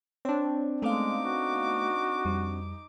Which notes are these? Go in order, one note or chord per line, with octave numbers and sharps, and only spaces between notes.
C4 D4 C#5
G#3 A3 B3 D#4 F5 D6
F#4
F2 G3